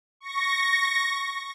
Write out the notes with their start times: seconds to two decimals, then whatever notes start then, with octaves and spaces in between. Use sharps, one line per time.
0.20 C#6 A#6